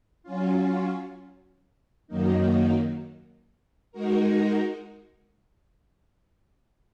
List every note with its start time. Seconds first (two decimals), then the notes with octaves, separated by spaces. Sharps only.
0.23 F#3 C#4 F4
2.08 F#2 D#3 F#3 A#3 D#4
3.92 G#3 D#4 F#4 A#4